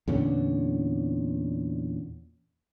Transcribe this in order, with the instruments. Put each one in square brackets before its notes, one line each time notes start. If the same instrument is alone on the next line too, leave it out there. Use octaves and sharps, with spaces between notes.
[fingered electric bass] E2 A#2 D3 C#4